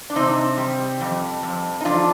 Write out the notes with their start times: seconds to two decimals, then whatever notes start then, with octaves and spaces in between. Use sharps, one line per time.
0.10 D4
0.16 C3 C4 D#4
0.58 G3
1.01 F2
1.43 F2
1.81 D#4
1.85 F2 D4 F4